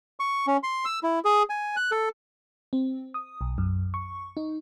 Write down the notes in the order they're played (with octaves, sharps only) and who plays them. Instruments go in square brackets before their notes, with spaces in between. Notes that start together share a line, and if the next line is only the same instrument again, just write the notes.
[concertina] C#6
C#4
C6
E6
E4
G#4
G#5
F#6
A4
[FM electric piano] C4
D#6
B1
F#2
C#6
D#4